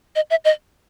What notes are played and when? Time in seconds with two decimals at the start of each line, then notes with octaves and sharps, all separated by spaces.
0.16 D#5
0.30 E5
0.45 D#5